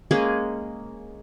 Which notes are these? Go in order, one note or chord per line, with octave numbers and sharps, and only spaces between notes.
G#3 A#3 C#4 G#4